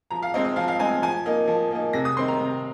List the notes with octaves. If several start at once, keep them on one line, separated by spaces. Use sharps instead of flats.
F3 A#5
F5
G#3 C4 D#4 D#5
D#5
F3 F5
F5
G#3 C4 D#4 G#5
F3 G#5
A#3 D#4
F3
A#3 D#4
C3 A#6
D#6
D#3 C4 D#4 C6
A#5
C3